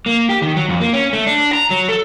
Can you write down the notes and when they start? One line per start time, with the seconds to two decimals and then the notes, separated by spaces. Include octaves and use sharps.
0.06 A#3
0.29 G4
0.42 D#3
0.56 F#3
0.69 F2
0.80 A#3
0.93 C#4
1.13 A3
1.26 D4
1.53 A#5
1.71 F#3
1.89 A4